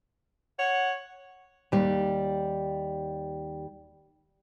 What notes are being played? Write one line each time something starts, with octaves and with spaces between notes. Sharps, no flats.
C#5 F#5
D#2 G3